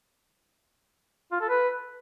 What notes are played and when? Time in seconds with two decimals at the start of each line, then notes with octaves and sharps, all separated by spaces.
1.32 F4
1.40 A4
1.49 B4